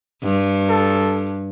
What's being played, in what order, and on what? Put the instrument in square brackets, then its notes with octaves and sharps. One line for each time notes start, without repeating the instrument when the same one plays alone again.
[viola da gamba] G2
[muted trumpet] A4